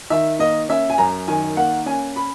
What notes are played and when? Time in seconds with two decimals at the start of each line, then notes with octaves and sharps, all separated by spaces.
0.10 D#3 E5
0.39 A#3 D#5
0.69 C#4 E5
0.90 G#5
0.98 F#2 A#5
1.28 D#3 G#5
1.57 A#3 F#5
1.86 C#4 G#5
2.16 B5